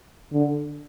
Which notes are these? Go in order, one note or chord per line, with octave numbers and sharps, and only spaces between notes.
D3